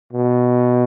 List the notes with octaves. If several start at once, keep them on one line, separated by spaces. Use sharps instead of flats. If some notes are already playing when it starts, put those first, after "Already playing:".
B2